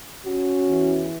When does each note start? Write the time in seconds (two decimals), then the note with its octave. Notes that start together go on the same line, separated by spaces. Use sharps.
0.25 C#4 F#4
0.65 E2 E3